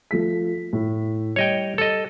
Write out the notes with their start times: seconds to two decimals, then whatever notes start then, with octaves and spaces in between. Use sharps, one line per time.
0.11 F3 A3 B6
0.73 A2
1.36 G3 C#5 D#5 G5
1.78 A4 D#5